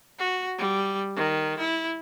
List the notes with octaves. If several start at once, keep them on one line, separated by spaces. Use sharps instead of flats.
F#4
G3
D#3
E4